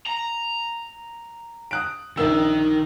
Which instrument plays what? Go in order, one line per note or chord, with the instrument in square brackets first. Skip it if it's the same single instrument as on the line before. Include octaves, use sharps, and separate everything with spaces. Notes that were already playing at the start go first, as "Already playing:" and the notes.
[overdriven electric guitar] A#5
[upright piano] D#6 F#6 D7
[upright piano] A#1 A#3 E6 [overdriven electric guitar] D#3